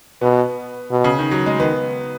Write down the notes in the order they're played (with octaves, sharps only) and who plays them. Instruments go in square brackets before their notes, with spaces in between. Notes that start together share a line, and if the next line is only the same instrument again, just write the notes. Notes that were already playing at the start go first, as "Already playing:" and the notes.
[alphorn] B2 [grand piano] B3
[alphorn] B2
[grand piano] C#3
D#3
F#3
G#3
[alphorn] D#3 [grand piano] B3